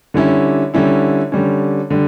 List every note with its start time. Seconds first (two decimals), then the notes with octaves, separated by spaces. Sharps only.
0.14 D3 G3 C#4 E4
0.74 D3 G3 C#4 E4
1.32 D3 G3 C#4
1.90 D3 G3